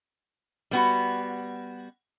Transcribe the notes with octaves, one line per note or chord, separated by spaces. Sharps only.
G3 B3 F#4